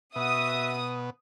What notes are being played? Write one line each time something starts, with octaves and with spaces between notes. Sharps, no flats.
B2 F#4 E5 D#6